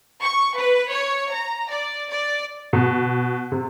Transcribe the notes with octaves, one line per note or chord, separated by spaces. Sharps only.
C#6
B4
C#5
A#5
D5
D5
B2
C3